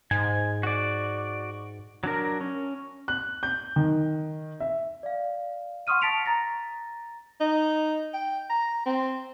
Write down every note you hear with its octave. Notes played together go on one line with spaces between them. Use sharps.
G#2 G#5
F#4 D5
F#3 D4 A#4
C#4
F#6
G6
D#3
E5
D5 F5
F#5 C6 C#6 D#6 F6 D#7
A5 A6 B6 C#7 D7 F7
A#5 A6 A#6
D#4
G5
A#5
C4